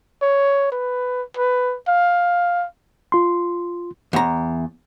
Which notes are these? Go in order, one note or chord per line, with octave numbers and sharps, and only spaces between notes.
C#5
B4
B4
F5
F4 C6
E2 A#5